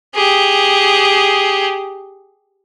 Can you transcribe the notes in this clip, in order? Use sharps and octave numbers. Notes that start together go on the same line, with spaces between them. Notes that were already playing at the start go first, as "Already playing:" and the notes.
G4 G#4